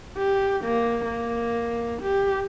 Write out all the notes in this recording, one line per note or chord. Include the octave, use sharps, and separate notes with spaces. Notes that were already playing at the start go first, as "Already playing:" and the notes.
G4
A#3
A#3
G4